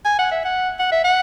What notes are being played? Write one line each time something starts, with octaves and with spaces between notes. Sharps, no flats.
G#5
F#5
E5
F#5
F#5
E5
F#5